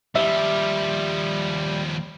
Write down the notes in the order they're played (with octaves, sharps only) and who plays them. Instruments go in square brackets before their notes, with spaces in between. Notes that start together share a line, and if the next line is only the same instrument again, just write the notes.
[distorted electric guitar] D#2 F3 [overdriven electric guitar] G3 [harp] E5